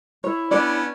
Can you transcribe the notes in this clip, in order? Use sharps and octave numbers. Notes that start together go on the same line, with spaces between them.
E4 C#5
B3 C#4 D4 D5